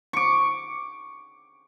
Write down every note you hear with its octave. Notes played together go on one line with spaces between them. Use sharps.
C#6 D6